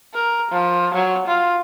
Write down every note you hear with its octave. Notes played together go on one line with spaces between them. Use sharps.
A#4
F3
F#3
F4